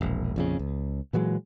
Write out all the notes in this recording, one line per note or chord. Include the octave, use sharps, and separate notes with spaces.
E1 A#1
A#1 F2 C#3
C#2
A#2 E3 F#3 G#3